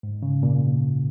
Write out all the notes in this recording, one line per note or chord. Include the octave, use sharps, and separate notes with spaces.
G#2
C#3
A#2